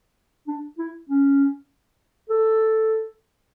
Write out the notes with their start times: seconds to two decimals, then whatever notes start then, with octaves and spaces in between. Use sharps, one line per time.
0.48 D4
0.78 E4
1.09 C#4
2.30 A4